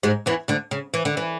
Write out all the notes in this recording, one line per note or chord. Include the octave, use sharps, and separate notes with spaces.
G#2 G#3
E2 E3
D2 D3
C#3
E3
D3
E3